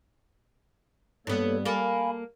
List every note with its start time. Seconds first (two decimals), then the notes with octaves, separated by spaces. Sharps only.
1.27 G2 A#3 B3 A4 C#5
1.65 A#3 A4 F5 G#5 B5